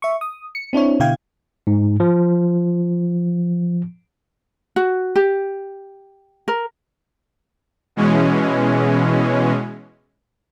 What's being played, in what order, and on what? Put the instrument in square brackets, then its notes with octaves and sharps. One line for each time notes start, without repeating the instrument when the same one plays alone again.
[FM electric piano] E5 C#6
D#6
C#7
C4 D4 E4 C#5
B2 D3 E4 F5 G5 G#6
[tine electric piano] G#2
F3
[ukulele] F#4
G4
A#4
[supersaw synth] B2 E3 G#3 C#4